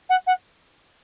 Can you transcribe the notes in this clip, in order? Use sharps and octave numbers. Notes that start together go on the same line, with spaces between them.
F#5
F#5